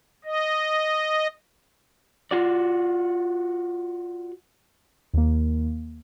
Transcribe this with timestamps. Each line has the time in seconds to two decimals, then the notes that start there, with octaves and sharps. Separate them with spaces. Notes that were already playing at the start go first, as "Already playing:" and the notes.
0.25 D#5
2.31 F4 F#4 D5
5.14 D#2 A#3